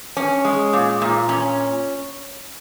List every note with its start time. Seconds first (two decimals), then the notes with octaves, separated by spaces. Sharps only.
0.17 C#4
0.45 G#3
0.73 A#2
1.02 A#2
1.29 C#4